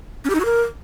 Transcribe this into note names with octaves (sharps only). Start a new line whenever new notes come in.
C#4
G4
D#4
F#4
A#4